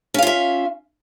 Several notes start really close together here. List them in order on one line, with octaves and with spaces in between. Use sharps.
C#4 F5 F4 E5